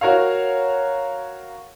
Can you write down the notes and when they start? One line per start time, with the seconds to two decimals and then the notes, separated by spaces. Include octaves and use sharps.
0.01 F#4 A#4 C#5 F5